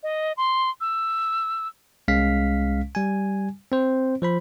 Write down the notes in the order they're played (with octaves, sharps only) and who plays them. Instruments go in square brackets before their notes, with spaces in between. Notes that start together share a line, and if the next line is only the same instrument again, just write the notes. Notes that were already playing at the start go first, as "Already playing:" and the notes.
[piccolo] D#5
C6
E6
[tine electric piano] C2 G#3 C#4 F5 B6
G3 G#5
C4 C5
F3 C5 B5